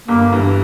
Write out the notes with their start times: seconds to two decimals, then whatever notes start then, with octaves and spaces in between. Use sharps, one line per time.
0.08 G1 A#3
0.32 G2 E3